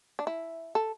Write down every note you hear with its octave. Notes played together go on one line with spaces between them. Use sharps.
D4
E4
A4